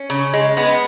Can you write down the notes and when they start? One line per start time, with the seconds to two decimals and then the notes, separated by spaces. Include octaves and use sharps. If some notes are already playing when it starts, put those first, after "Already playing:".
Already playing: C#4
0.10 C#3
0.33 G#3
0.57 G#3 B3